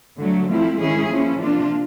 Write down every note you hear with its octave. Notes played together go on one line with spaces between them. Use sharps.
D3 F#3 A3
F3 A3 C4 E4
D#3 G#3 C#4 E4 G#4
F3 A#3 C#4 E4
C3 F3 A#3 D4 F4